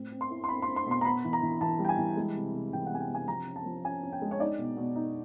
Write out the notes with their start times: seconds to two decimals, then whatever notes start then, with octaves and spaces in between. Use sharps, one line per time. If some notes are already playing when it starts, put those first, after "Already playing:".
Already playing: A2 C4
0.12 C4
0.21 C6
0.30 E4
0.44 C6
0.48 C4 B5
0.62 C6
0.67 C4
0.76 C6
0.86 B2 C6
1.01 A#5
1.05 B3 B5
1.24 E3
1.33 A#5
1.42 E3
1.61 E3 A5
1.79 G3
1.84 G5
1.89 G#5
1.98 E3
2.17 G#3
2.36 C3
2.54 C3
2.73 E3 G5
2.87 F#5
2.92 C3 G#5
3.00 G5
3.10 C3 G#5
3.28 F3 A#5
3.48 C#4
3.56 A5
3.65 F3
3.84 C#4 G#5
4.03 C#4
4.12 G5
4.22 G#3
4.31 C#5
4.40 D#4 D5
4.59 B2
4.77 B2
4.96 D#4